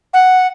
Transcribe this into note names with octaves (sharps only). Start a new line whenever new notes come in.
F#5